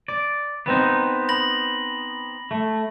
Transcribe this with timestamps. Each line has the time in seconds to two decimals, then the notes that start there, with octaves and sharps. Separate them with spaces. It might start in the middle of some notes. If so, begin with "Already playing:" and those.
0.08 D5
0.66 B3 C4 D#4
1.29 B5 A#6 F#7
2.51 A3